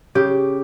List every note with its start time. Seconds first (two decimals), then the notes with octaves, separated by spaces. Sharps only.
0.15 C#3 G4